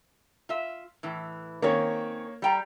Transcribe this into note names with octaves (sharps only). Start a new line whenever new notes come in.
F4 E5
A2 E3
D#3 A#3 C4 C#4 C#5
G3 G5 A#5